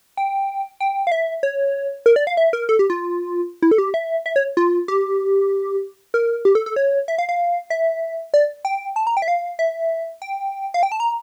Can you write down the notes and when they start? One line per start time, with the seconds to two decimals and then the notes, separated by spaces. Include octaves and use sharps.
0.17 G5
0.80 G5
1.07 F5
1.11 E5
1.43 C#5
2.06 A#4
2.16 D5
2.27 F5
2.37 E5
2.53 A#4
2.69 A4
2.79 G4
2.90 F4
3.62 E4
3.71 A4
3.78 G4
3.94 E5
4.26 E5
4.36 C#5
4.57 F4
4.88 G4
6.14 A#4
6.45 G4
6.55 A4
6.66 A4
6.76 C#5
7.08 E5
7.18 F5
7.29 F5
7.70 E5
8.34 D5
8.65 G5
8.96 A5
9.07 A#5
9.17 G5
9.22 E5
9.28 F5
9.59 E5
10.22 G5
10.74 F5
10.83 G5
10.92 A5
11.00 A#5